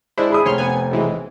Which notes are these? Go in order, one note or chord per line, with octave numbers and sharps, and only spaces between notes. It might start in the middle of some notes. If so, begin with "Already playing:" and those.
G#3 D4 E4 C5
G#4 B5 D#6
F1 C#5 C6 F6
B3 G#5
B1 E3 G#3